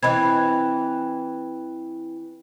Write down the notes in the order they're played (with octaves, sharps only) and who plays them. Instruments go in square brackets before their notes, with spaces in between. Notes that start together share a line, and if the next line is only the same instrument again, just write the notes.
[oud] E3 C4 [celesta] D#5 B5 G#6